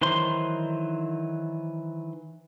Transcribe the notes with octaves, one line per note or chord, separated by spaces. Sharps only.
D#3 E3 F#3 C5 C6